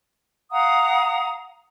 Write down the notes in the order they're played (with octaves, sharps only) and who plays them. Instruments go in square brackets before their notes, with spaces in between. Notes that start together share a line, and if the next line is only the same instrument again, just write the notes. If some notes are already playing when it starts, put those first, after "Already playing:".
[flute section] F5 F#5 A#5 D#6